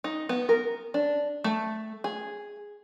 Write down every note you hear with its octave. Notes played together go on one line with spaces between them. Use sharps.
D#4
B3
A#4
D4
A3
G#4